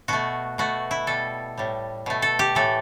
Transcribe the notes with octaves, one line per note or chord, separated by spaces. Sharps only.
B2 A3 F#4
B2 A3 F#4
E4
B2 G3 A4
A2 G3
B2 A3
A4
G4
A2 E3 A3 A4